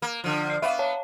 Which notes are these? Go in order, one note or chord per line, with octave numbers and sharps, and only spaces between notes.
A#3
D3 F3
C7
B3 B4 E5 F5
C#5 F5 A5